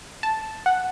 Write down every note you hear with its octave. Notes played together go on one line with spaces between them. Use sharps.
A5
F#5